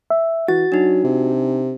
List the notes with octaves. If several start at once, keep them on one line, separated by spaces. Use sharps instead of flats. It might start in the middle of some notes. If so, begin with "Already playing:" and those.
E5
E3 F#4 A6
F#3 D4 D#4
C3